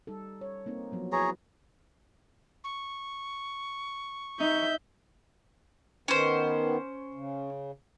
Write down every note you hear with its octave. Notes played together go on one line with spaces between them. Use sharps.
G3 D#4 A4
C#5
A#3 C4 D#4
F3 F#3 B3
E4 F#4 G#4 B4 C#5 A#5
C#6
D#4 E5 G6
D#3 B3 C#4 C5
C#3